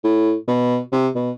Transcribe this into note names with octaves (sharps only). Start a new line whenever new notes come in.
A2
B2
C3
B2